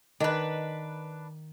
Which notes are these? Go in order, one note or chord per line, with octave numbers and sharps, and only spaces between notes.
D#3 D4 B4